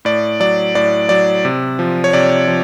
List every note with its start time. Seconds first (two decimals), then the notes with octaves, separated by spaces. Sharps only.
0.05 A2 D5
0.40 F#3 D5
0.75 A2 D5
1.09 F#3 D5
1.45 C3
1.79 F3
2.04 C#5
2.13 C3 D5
2.48 F3